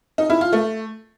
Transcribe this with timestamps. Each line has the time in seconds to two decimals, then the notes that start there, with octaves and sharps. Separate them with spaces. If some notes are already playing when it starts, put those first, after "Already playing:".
0.18 D#4
0.30 E4
0.41 F4
0.53 A3